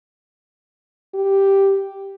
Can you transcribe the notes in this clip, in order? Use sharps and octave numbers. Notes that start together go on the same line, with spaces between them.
G4